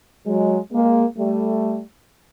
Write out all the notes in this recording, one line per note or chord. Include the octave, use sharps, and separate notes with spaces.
F#3 G#3
G#3 A#3
G3 A3